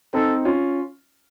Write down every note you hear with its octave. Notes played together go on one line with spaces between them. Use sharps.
C4 D#4 A4
C#4 F4